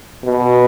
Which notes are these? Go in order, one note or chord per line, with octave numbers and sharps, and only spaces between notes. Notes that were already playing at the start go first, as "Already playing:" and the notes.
B2